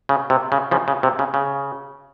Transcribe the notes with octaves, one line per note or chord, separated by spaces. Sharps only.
C#3
C3
C#3
C#3 F3
C#3
C3
C#3
C#3